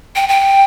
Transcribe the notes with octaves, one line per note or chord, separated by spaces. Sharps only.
G5
G5